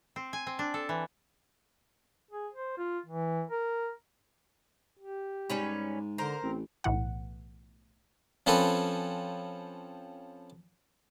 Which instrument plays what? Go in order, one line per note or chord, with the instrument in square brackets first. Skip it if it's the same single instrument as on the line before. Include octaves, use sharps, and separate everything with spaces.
[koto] C4
G#5
C4
D4
A4
E3
[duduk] G#4
C5
F4
E3
A#4
G4
[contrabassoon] G#2 [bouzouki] G3 C#4 B4
[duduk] D3 [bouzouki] A#4 C5
[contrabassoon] A1 [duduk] C4
[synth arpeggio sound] B1 A2 E3 F#5
[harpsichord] F3 C4 C#4 A4 B4